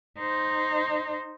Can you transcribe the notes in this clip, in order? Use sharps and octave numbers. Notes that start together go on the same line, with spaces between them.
D#4 C5